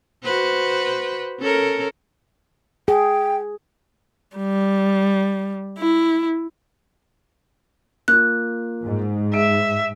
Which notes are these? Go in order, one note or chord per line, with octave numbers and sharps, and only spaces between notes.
F#4 B4 C5
C#4 A4 A#4
G#4 G5
G3
E4
A#3 F4 F#6
G#2
E5 D7